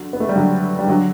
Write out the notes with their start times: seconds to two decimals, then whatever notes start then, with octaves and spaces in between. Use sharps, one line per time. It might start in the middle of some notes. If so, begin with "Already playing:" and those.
Already playing: D3 F#3
0.13 B3
0.20 A3
0.29 G3
0.36 D3 F#3
0.79 G3
0.88 D3 F#3